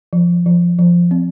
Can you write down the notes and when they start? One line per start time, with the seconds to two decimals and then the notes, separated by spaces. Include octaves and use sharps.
0.13 F3
0.46 F3
0.79 F3
1.11 C4